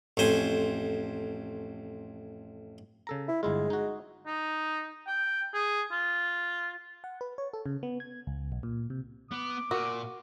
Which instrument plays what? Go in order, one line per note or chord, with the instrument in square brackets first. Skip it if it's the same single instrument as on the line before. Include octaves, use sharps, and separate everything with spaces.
[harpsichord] A1 F2 C5 G#5
[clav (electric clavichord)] C#3 A4 A#5
[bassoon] E4
[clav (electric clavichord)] G1 E4 F4 [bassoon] G#3
[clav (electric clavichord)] D#4 F#4
[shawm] D#4
G5
G#4
F4
[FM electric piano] F#5
B4
C#5
A4
C#3
B3
G#6
C#2
B1
A#2
C3
[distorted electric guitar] B3 [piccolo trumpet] D6
[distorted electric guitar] A#2 [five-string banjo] F#4 [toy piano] A#4